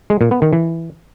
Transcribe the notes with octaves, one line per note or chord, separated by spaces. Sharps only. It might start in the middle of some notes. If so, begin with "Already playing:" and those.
G#3
A#2
B3
D#3
E3